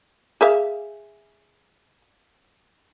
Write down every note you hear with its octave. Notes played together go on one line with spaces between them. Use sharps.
G#4 E5 F5